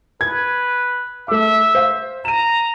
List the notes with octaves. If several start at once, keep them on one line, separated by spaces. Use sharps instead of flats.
B4 G#6
A3 E5 D6
C5 F5
A#5 D#7 E7